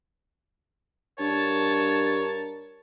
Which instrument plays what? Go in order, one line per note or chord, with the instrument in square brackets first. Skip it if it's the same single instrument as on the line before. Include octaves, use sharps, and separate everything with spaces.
[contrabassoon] G2 [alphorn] A#4 [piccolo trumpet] C#5 [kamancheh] A5